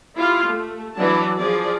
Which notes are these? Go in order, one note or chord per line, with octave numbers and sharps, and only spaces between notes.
E4 F4 G4 F5
A3
E3 F#3 D4 F#4 D5 A5
F3 G#4 D5